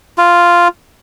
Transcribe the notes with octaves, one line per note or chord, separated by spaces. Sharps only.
F4